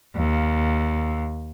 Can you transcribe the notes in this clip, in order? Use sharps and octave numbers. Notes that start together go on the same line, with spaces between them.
D#2